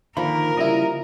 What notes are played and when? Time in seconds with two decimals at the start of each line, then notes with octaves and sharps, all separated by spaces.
0.17 D3 D#3 F3 A#3 A#4 B5
0.57 C#3 G3 E4 D#5